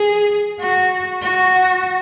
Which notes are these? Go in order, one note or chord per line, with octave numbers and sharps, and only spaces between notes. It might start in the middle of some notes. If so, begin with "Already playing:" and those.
Already playing: G#4
F#4
F#4